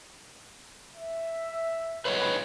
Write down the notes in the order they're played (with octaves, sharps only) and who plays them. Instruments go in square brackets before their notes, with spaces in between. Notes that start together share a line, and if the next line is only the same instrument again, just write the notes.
[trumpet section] E5
[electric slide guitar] B4 C#5 D#5